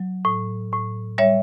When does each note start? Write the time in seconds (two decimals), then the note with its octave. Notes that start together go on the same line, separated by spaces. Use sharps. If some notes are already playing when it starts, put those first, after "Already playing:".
Already playing: F#3
0.25 A2
0.73 A2
1.18 G3 C#5 E5